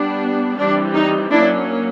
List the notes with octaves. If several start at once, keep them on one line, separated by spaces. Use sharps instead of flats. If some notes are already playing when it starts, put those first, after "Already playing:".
Already playing: G3 B3 D4
E3 G3 C4 D4
D#4
F#3 A#3 C#4 D4 E4